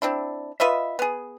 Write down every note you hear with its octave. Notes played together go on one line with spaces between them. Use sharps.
C4 D4 E4
F4 B4 D#5 E5
B3 G#4